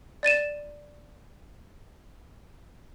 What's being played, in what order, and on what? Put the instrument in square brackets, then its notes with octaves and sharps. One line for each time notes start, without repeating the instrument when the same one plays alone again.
[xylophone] D5 A6 D#7 E7